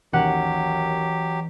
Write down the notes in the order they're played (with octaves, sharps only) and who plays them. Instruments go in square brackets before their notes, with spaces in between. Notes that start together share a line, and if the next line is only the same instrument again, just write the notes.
[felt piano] D#2 [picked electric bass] E3 C#4 [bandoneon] F#3 G4 [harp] F#5